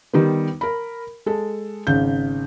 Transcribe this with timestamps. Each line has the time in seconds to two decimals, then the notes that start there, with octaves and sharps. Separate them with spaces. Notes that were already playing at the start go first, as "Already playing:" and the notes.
0.13 D#3 G3 B3
0.61 A#4 B5
1.26 G#3 A4
1.87 G#1 C#3 G6